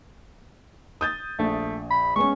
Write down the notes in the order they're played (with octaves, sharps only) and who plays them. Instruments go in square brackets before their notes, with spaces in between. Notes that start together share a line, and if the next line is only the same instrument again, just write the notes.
[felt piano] D#6 G6 A6
[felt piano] A#1 [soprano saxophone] A3
[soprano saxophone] B5
[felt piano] G#3 B3 C#4 [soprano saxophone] C#6